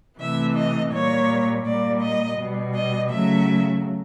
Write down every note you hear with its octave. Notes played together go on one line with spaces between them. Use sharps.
C3 E3 A3 E5
D#5
A#2 G3 C#5
A#2 G3 D5
D#5
B2 G3
D#5
C#3 F#3 A3 E5